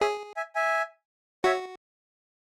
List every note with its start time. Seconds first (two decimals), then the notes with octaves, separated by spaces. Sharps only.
0.01 G#4 C#5 E5
0.36 E5 G#5
0.55 E5 G#5
1.44 F#4 C#5 E5